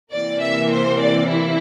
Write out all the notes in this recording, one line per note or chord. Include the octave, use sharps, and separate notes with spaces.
C3 E3 A#3 D5
E5
C5
D5
E4